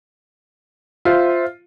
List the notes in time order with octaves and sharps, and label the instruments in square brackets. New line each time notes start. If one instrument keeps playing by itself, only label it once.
[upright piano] F4 [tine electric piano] C5 E5